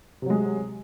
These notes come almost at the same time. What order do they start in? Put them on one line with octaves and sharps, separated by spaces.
C3 F#3 G#3